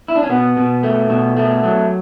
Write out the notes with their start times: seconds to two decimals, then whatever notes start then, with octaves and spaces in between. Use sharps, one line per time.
0.08 E4
0.16 D4
0.23 C#4
0.30 B2 B3
0.57 B2
0.83 A3
1.10 B2
1.37 A3
1.64 F#3